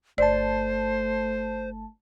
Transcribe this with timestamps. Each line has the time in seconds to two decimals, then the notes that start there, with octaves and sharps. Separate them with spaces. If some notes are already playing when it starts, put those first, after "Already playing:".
0.18 G1 A3 C5 D5 A5